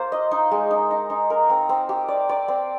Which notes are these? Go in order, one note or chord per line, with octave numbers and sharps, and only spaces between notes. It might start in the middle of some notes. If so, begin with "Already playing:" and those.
Already playing: A#3 F4 C5
D#5
D#4
G#3
D#4
D#4
D#4
A#4
C4
C4
G4
D5
D5
C4